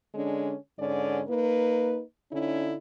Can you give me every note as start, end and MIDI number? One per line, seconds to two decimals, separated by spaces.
0.15 0.54 50
0.15 0.54 56
0.15 0.54 61
0.15 0.54 62
0.79 1.21 44
0.79 1.21 50
0.79 1.21 61
0.79 1.21 74
1.29 2.01 58
1.29 2.01 63
1.29 2.01 71
2.32 2.75 50
2.32 2.75 61
2.32 2.75 63
2.32 2.75 64